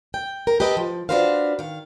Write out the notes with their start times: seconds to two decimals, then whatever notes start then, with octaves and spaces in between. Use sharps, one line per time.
0.14 G5
0.47 A#4
0.60 G4 A4 B4 D#5
0.77 F3
1.09 D4 F4 F#4 B4 C5 F5
1.59 D#3 F5